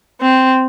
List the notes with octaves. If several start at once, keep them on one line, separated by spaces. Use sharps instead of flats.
C4